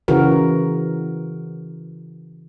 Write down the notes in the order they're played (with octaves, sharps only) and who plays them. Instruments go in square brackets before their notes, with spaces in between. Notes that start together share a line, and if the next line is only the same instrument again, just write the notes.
[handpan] C#3 E3 F#4 A#4